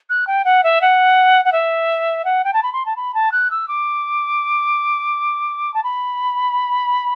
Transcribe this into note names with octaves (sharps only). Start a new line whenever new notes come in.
F#6
G5
F#5
E5
F#5
F#5
E5
F#5
G5
A5
B5
C6
A5
B5
A5
F#6
E6
D6
A5
B5